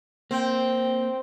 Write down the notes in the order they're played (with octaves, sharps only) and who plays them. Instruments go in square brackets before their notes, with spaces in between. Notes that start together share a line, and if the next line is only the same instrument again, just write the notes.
[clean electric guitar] A#3 [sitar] C4 [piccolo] G5